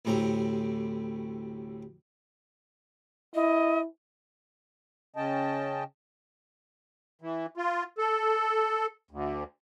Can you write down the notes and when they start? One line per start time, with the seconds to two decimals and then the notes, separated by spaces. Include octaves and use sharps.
0.05 A1 D2 A2 C3 G3 A#5
3.35 E4 D#5
5.16 C#3 C#4 D#5 G5 A5
7.21 E3
7.57 F4
7.98 A4
9.11 D2